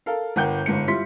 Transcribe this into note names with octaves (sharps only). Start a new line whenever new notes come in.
A4 A#4 F5
G1 A#4 F#5 G5 G6
G1 G#2 C#7
G3 E4 F4 C6 B6